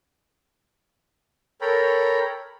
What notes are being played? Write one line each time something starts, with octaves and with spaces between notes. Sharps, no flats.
A4 A#4 C#5 G5 A#5 B5